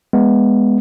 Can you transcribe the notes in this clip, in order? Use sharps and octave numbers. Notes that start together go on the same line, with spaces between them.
G#3 B3